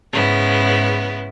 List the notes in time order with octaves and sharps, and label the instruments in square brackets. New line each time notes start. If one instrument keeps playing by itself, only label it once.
[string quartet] G#2 C#3 B3 E4